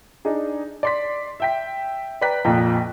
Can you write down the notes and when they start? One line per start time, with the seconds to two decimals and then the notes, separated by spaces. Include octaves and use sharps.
0.25 D4 D#4 G#4
0.83 D5 C6 B6
1.40 E5 G5 B6
2.21 B4 D5 G5 A#5 F#6 B6
2.44 A#1 F2 A#2 F3 G5 A#5